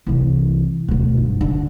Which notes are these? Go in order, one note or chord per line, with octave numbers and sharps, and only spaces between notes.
C2 E3
D2 B2
G2
D3